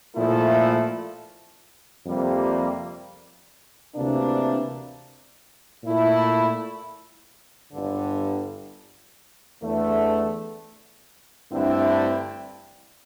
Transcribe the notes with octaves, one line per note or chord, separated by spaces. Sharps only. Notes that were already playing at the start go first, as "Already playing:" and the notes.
A#2 F3 A3 E4 A4
F2 C3 G3 A#3
D2 C3 E3 A#3 D4
A#2 A3 E4
G1 G2 D3
E2 D3 A3
G2 D3 A3 C4 E4